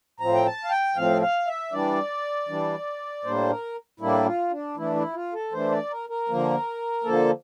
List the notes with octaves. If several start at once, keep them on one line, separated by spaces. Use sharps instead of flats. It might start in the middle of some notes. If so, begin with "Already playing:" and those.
A2 F3 C4 A#5
G5
A5
F5
G5
A2 F3 C4 F5
F5
E5
E3 G3 D4 D5
E3 G3 D4
A2 G3 A#3 D4 C5
A#4
A2 G3 A#3 D4 E4
F4
D4
E3 A3 D4 E4
E4
F4
A4
E3 A3 D4 C5
D5
A#4
A#4
D3 F3 A#3
D3 F3 A#3 A4